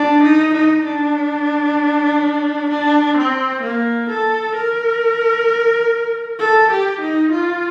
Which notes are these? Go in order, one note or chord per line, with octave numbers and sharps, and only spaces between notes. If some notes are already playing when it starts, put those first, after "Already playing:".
Already playing: D4
D#4
D#4
D4
D4
C4
A#3
A4
A#4
A4
G4
D#4
F4